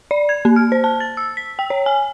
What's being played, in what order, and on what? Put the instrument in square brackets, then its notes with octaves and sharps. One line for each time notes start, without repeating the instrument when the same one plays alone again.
[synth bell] D5
G#6
A#3
F6
C5
A5
A6
E6
B6
G5
C#5
G#5